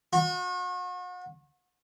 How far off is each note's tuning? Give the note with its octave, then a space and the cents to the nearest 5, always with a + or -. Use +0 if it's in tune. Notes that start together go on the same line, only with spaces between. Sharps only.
F#4 -40